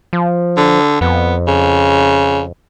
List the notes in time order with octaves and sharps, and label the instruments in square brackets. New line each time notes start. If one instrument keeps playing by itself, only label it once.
[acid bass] F3
[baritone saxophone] D3
[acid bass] F2 [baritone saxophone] B3
[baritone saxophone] C#3